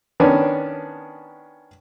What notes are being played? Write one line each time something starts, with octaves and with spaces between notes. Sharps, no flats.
D#3 B3 C#4 D4